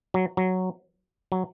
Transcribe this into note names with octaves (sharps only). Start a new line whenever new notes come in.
F#3
F#3
F#3